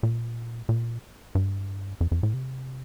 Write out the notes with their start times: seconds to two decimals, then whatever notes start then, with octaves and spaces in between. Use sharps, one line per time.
0.03 A#2
0.69 A#2
1.35 G2
2.01 F2
2.11 F2
2.23 A2
2.34 C3